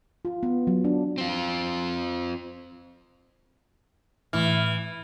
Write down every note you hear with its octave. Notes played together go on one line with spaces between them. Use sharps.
F4
B3
F#3
D4
C4 F4
A2 E3 F6